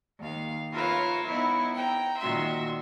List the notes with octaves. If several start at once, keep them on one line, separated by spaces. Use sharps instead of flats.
D#2 F5
F4 A#4 B4 C#5 E5 F5
B3 D#4 E4
G5 A#5
A#2 D#3 F#4 E5 C6